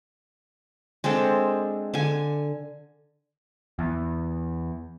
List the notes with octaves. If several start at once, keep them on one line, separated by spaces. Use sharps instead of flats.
G#3 C4 D4 A4
D3 G#5
E2